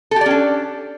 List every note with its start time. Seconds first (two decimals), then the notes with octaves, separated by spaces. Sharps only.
0.11 A4
0.16 G4
0.21 D5
0.26 C#4
0.31 D4